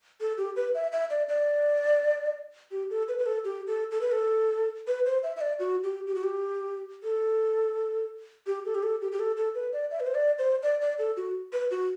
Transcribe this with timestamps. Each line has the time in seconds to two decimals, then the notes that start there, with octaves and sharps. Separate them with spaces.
0.21 A4
0.38 G4
0.56 B4
0.75 E5
0.92 E5
1.10 D5
1.28 D5
2.71 G4
2.90 A4
3.08 B4
3.19 B4
3.26 A4
3.44 G4
3.67 A4
3.91 A4
4.01 B4
4.12 A4
4.87 B4
5.06 C5
5.23 E5
5.36 E5
5.41 D5
5.59 F#4
5.83 G4
6.07 G4
6.15 F#4
6.24 G4
7.03 A4
8.47 G4
8.66 A4
8.75 G4
8.83 A4
9.02 G4
9.12 G4
9.19 A4
9.37 A4
9.55 B4
9.73 D5
9.91 E5
10.00 B4
10.07 C5
10.15 D5
10.39 C5
10.63 D5
10.81 D5
10.99 A4
11.17 F#4
11.53 B4
11.71 F#4